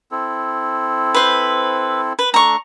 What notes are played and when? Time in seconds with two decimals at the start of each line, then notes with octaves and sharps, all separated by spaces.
0.11 C4 E4 A4
1.14 B4 C5
2.19 B4
2.34 A3 D4 A#5 C#6